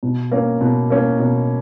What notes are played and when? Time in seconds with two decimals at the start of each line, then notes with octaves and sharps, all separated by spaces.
0.03 B2
0.32 A#3 C#4
0.61 B2
0.90 A#3 C#4
1.19 B2